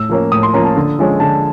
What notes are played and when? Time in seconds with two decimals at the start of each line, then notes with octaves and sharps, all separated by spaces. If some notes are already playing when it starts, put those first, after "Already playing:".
Already playing: A2 E6
0.09 F3 A#3 C#4
0.32 A2 D#6
0.43 C6
0.54 F3 A#3 C#4 A#5
0.65 A5
0.77 D3
0.99 F3 G#3 C#4
1.20 D3 A5